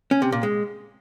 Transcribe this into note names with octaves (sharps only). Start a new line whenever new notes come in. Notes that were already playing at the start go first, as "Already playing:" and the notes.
C#4
C3
A#2
G#3